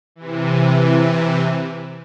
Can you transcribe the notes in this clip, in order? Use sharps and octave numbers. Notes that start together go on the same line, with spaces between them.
C3 E3